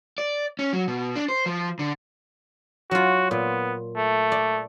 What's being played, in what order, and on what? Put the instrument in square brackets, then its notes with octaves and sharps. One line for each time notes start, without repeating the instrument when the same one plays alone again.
[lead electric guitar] D5
C#4
F#3
B2
D4
C5
F3
D3
[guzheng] F#3 F4 [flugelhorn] F#4
[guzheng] A#2 [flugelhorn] B3
[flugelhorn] A3
[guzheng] D5